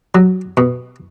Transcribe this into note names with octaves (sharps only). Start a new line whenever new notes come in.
F#3
B2